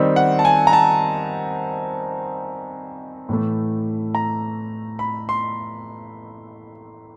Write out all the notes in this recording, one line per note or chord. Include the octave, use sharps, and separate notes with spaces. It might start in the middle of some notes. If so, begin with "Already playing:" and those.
Already playing: D#3 G3 C4 D#4
F#5
A5
G#5
A#5
A5
A2 E3 A3
A#5
B5
C6